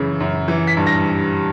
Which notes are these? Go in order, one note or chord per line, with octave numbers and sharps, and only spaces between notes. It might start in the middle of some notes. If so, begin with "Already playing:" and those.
Already playing: F#2 C#3 E3
F#2
E3
B6
G2
A#6